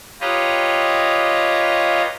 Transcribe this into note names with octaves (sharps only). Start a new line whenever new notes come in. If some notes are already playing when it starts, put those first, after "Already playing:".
F4 G4 B4 C#5 D#5 A#5